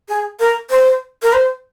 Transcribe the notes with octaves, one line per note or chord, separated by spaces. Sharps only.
G#4
A#4
C5
A#4
C5